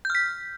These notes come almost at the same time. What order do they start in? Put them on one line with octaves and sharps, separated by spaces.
G6 F6 B6